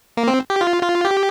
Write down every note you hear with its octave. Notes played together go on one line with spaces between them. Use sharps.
A#3
C4
G4
F4
F4
G4